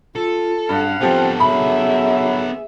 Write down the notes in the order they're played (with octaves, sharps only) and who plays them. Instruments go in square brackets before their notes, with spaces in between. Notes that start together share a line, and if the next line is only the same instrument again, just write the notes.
[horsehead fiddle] F4 [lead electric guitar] A4
[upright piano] G2 [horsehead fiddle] F5 F#5
[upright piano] F3 G4 [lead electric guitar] B3 A4 [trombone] C4
[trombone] F#3 [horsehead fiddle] G#4 E5 [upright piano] B5